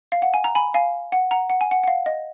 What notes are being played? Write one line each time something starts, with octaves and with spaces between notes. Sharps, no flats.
F5
F#5
G#5
A#5
G#5 B5
F5 G#5
F#5
F#5 A#5
F#5
G#5
F#5
F#5
F5
D#5